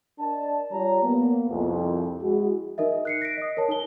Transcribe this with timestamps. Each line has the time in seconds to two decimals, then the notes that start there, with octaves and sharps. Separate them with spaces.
0.19 D4 A#4 D5 D#5 A5
0.72 G3 F4 C#5 A#5
1.03 A#3 B3
1.49 C2 F2
2.22 G#3 E4 F#4 G#4
2.78 D#4 A#4 D#5 E5
3.05 F#6 C7 C#7
3.21 A#6 B6 D7
3.37 D#5 D#6
3.57 A#4 C#5 A5
3.68 D#4 A#4 G7